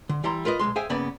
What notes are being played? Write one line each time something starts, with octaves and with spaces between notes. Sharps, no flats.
D3
E3 G3 E4 A#5 C6
F4 A#4 B4 D#5
B1 G2 G#3 C6
G#4 C5 E5 F5 G5 G#5
G2 C#3 A#3 B3 D5 B5